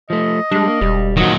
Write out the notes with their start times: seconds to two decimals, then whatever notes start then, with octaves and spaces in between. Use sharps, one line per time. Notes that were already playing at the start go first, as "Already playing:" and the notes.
0.10 F3 A3 D#5
0.51 G3 G#3 D4
0.68 A#3
0.81 E1 G3
1.17 A#2 D#3 F#3 F#4 D#5